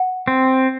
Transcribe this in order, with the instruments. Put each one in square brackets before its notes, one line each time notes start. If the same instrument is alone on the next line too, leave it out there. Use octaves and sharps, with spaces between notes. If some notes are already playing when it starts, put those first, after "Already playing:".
Already playing: [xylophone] F#5
[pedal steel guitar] C4